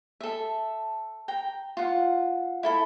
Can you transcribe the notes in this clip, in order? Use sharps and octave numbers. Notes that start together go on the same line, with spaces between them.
A4 E5
G5 A#5
F4 F#5
E4 A4 B5